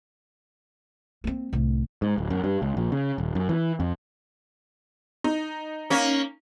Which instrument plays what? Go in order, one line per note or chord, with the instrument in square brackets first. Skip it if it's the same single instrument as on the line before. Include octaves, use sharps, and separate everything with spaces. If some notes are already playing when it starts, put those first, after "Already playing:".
[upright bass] A#3 C4
C2 A2
[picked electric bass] G#2
D1
F#2
G2
C#2
A#1
C#3
D#1
F#2
E3
F2
[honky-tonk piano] D#4
[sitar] A#3 C#4